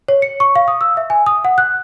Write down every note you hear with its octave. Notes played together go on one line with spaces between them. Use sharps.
C#5
C#7
C#6
F5
D#6
E6
E5
G#5
D#6
F#5
F#6